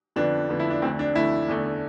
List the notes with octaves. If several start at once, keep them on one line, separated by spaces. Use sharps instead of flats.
F2 D3 F3 B3 D4
F2 D3 F3 B3
E4
D4
D2 D3 A3 C4
D4
D2 D3 A3 E4
E2 D3 A3